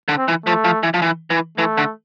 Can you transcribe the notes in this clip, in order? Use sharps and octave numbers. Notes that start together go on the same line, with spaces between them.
D3
C4
E3
F3 A3
F3
E3
F3
E3
E3
E3 A3
D3